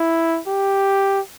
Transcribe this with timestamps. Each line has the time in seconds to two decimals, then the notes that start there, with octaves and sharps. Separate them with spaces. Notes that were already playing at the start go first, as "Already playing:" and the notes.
Already playing: E4
0.47 G4